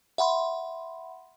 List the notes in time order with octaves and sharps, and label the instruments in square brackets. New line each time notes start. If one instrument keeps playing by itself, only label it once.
[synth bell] E5 F#5 B5 C6